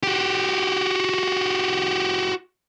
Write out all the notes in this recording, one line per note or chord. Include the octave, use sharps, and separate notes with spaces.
F#4 G4